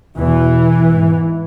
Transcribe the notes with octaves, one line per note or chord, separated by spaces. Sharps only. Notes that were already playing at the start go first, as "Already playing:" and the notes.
E2 B2 E3
G#2